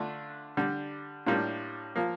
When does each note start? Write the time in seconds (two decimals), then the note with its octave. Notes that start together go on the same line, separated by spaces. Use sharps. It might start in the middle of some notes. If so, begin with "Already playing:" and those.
Already playing: D3 A3 D4 F4
0.57 D3 G3 D4
1.26 A2 G3 A#3 D4 F4
1.96 F3 A#3